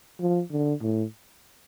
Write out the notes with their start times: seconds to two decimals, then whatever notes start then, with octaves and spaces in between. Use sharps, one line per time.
0.20 F3
0.52 D3
0.82 A2